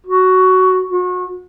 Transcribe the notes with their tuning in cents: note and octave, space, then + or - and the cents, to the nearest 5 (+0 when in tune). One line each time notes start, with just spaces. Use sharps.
F#4 +10
F#4 -35